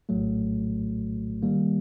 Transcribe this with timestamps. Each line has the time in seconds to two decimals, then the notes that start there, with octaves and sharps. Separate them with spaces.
0.09 A#1 A2 F#3 A3
1.43 D#3 G3 A#3